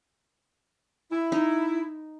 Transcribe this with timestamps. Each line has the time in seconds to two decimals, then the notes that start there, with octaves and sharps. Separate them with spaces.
1.12 E4
1.32 D#4